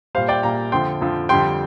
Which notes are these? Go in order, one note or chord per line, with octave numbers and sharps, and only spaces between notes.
A#2 G3 C5 F5
D5 G5
A#2 G3 F5 A#5
F2 D3 F3 G5 C6
F2 D3 F3
F2 D3 G3 G5 C6